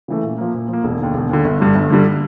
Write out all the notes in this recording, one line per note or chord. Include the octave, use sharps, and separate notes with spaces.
C#3 E3 A3
A#2
F3 A#3
A#2
F3 A#3
E1
D#2 D3
E1
D#2 D3
G1
G2 D3 G3
G1
G2 D3 G3